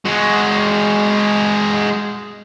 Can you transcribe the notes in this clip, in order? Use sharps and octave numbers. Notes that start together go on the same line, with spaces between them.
G#3 F#4